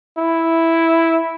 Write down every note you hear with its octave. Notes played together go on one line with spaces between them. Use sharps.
E4